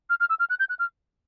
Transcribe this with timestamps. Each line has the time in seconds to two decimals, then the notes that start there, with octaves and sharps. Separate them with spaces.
0.10 F6
0.20 F6
0.29 E6
0.39 F6
0.50 F#6
0.59 G6
0.69 F#6
0.79 F6